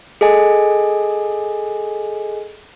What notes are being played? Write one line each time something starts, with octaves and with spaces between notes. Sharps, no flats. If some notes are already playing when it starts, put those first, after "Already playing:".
G#4 A4 D#5 G#5